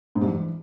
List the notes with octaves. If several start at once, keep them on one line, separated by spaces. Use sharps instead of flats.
G#2
G2
E3